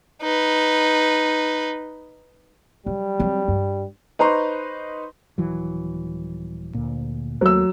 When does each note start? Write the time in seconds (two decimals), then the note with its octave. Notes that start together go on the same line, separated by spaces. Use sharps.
0.22 D#4 B4
2.86 F#3 G3
3.20 F#3 C4
3.48 G2
4.19 D#4 B4 C5 A#5 C6 C#6
5.38 D#1 E3 F#3
6.74 D2 A#2
7.41 D#2 F#3 A3 A#3 E6